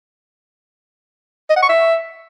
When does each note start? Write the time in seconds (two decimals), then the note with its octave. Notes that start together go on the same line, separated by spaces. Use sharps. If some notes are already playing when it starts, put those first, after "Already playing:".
1.50 D#5
1.56 F#5
1.63 C#6
1.69 E5